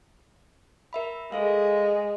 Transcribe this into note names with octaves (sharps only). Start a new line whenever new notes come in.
A#4 E5 B5
G#3 G#4 A4 F5